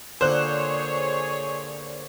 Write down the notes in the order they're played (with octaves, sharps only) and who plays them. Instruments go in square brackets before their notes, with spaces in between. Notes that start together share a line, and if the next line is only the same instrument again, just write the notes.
[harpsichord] A#2 D3 [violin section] G#4 C#5 [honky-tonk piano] C5 F#6